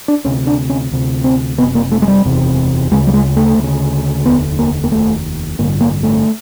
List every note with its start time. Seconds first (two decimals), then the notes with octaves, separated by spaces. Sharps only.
0.08 D4
0.24 D2 C3 C#4
0.47 D4
0.69 C#4
0.91 D2 C3
1.24 C4
1.58 F#1 E2 C3 B3
1.75 A#3
1.92 A3
2.02 G#3
2.08 G3
2.24 F#1 E2 C3
2.91 D2 C#3 G#3
3.07 G3
3.14 G#3
3.36 A3
3.58 D2
3.63 C#3
4.25 F1 D#2 D3 B3
4.59 A#3
4.84 A#3
4.91 F1 D#2 D3 A3
5.59 A1 G2 D3 A#3
5.80 A#3
6.03 A3